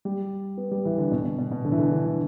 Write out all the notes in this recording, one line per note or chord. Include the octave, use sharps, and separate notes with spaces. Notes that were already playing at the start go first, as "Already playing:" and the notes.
G3
B3
G3
E3
D3
B2
B2
B2
B2
D3
E3
D3
D3
E3